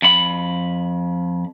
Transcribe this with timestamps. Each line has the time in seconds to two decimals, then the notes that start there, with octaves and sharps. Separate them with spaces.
0.02 F2 B5